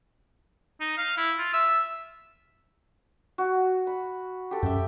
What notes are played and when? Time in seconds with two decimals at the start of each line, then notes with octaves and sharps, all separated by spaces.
0.81 D#4
0.98 F5
1.17 E4
1.38 F4
1.53 E5
3.38 F#4
3.87 B5
4.51 G4 A4
4.63 F#2 E5 G5